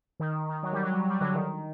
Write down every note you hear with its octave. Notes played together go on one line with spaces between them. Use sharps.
D#3
D#3
F#3
G3
F#3
G3
F#3
G3
D3 F#3
D#3